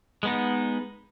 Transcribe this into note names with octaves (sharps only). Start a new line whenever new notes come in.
G#3 B3 D#4